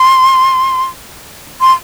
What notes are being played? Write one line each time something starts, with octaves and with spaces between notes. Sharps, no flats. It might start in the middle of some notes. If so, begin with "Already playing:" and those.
Already playing: C6
C6